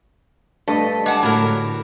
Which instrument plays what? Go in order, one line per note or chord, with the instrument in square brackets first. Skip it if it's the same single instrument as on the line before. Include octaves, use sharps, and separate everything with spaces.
[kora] G2 D#5 [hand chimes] A3 A5 B6 [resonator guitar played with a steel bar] A4
[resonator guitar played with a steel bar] G#3 F#5 A5 [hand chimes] D6
[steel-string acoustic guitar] A2 D3 [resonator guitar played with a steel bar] F#3 A#4 [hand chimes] B5